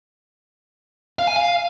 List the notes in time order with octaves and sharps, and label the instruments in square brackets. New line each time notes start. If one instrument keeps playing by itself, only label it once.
[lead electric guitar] F5
G#5
F5